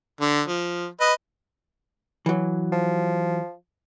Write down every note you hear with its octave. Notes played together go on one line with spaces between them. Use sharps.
D3
F3
B4 D#5
E3 F#3
F3